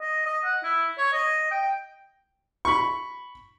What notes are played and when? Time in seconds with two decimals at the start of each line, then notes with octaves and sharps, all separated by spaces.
0.01 D#5
0.26 D#5
0.44 F#5
0.64 E4
0.98 C#5
1.13 D#5
1.51 G5
2.65 B5 C#6